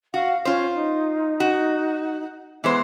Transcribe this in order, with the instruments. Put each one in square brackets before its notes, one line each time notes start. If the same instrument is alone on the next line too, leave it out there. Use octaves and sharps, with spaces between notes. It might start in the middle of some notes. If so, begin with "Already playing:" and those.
[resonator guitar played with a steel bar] F#4 [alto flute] F5
[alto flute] C#4 [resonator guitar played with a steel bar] F4 C5
[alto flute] D#4
[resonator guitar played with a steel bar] F#4
[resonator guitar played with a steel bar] E3 G#3 C5 [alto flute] B3